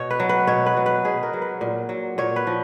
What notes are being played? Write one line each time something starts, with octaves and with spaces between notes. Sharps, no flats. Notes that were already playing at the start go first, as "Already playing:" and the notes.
Already playing: B2 C#5
B4
F#3
B4
B2 C#5
B4
F#3
B4
B2 G#4
A#4
F#3
B4
A#2
F#3
A#2 C#5
B4
F3